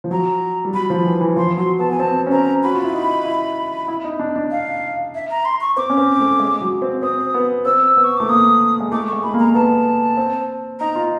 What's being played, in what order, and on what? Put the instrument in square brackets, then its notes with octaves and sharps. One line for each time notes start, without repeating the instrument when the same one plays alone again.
[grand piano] F3
[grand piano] F#3 [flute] A#5
[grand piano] G3
[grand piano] F#3 [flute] B5
[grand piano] F3
E3
E3
[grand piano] F3 [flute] C6
[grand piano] F#3 [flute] C6
[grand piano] B3 [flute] A5
[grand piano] B3 [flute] G#5
[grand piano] C4 [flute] A5
[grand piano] C#4
[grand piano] C4 [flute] A#5
[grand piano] F#4 [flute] B5
[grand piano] F4
E4
D#4
E4
E4
D#4
D4
D4
[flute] F5
E5
A#5
C6
C#6
[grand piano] C4 [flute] D6
[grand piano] C#4
C4
A3
G#3
F#3
C4
[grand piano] C4 [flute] D#6
[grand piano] B3
[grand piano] C4 [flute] E6
[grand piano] B3
[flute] C#6
[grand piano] A3 [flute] D6
[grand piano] A#3 [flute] D#6
[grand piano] G#3
[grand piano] A3 [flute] D6
[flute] C#6
[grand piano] G#3
[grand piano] A3 [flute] B5
[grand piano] A#3
[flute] A#5
[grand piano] B3 [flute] A5
[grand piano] C4
[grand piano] D#4 [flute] A#5
[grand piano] F4